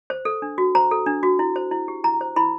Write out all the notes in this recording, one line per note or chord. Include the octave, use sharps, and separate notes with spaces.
C5
A4
D4
F#4
C5 A#5
A4
D4
F#4
E4
C5
E4
G4
E4 A#5
C5
E4 B5